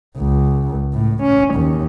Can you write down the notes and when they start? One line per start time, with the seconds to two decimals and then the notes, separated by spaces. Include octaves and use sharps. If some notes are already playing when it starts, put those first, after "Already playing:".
0.17 C#2
0.93 A2
1.23 C#4
1.55 D#2